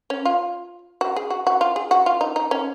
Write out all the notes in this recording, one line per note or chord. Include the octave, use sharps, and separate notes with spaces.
C#4
F4
F#4
G#4
F#4
F#4
F4
G#4
F#4
F4
D#4
D#4
C#4